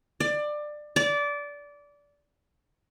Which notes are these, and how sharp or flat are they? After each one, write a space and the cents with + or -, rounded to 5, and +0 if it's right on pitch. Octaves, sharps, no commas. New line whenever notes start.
D5 +20
D5 -20